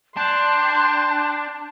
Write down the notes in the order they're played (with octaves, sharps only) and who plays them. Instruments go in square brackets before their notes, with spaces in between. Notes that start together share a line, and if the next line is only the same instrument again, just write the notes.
[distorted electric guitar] D4 [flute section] G5 F#6 G6 [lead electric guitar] A5 [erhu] C6